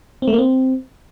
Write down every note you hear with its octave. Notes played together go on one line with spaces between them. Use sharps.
C4
A3
A#3
C4